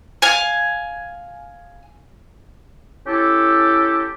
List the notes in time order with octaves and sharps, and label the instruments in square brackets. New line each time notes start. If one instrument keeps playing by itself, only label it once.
[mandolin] F5 G#5
[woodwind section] C#4 E4 G4 A4